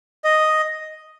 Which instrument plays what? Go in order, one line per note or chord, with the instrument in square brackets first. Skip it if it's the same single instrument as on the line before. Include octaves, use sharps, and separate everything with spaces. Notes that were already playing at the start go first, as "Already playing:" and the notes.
[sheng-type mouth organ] D#5